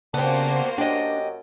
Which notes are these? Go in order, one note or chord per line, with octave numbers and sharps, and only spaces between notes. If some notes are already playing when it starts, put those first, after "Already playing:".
C#3 A#3 B3 D4 F#4 G4 C5
F#2 D4 G4 D#5